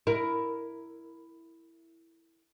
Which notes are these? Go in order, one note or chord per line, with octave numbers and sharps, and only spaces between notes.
E4 A#4